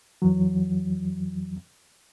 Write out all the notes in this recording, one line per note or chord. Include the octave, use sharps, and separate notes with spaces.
F2 E3 F#3